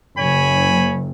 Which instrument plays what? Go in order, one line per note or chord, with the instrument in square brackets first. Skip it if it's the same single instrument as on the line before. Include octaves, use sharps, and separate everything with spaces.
[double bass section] F#1 [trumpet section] C#5 G#5 B5